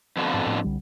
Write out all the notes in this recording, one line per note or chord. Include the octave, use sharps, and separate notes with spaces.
F2 B2 D3
G#2
A2
C2 D3 G3